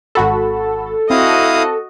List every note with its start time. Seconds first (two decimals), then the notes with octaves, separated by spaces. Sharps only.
0.15 G#1 F#4 A4 B5
1.10 C4 E4 F#4 D#5 F5 D#6